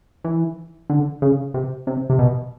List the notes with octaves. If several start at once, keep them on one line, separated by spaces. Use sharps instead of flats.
E3
D3
C#3
C3
C3
C3
B2